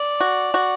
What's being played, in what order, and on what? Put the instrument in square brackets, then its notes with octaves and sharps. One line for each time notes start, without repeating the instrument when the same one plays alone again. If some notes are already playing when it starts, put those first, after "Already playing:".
Already playing: [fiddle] D5
[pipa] F#4
F#4